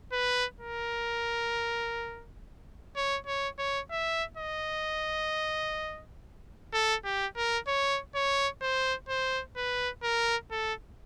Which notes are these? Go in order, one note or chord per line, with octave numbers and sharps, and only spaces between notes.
B4
A#4
C#5
C#5
C#5
E5
D#5
A4
G4
A#4
C#5
C#5
C5
C5
B4
A#4
A4